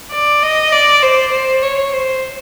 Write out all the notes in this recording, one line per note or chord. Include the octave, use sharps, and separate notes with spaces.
D5
D#5
D5
C5
C5
C#5
C5